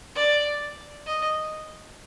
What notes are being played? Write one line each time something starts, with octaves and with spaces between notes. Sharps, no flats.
D5
D#5